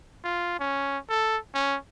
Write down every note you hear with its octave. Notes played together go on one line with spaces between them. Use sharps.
F4
C#4
A4
C#4